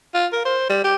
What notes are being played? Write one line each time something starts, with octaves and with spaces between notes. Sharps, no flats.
F4
A#4
C5
G3
G4